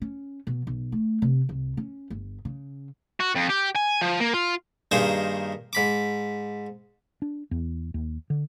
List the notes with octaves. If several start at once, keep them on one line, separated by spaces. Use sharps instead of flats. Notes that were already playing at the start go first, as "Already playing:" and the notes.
C#4
B2
B1
A3
C3
C2
C#4
G1
C#3
F#4
F2
G4
G#5
F3
A#3
F4
G2 D#3 A#3 D#4 G#4 C5
G#2 B5 D6
D4
E2
D#2
D3